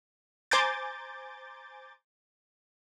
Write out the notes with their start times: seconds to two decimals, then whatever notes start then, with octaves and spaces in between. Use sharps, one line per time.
0.51 C5 G#5 A#5 D6 G6 A6